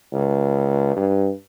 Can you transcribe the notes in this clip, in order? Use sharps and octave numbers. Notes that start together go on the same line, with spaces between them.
C#2
G2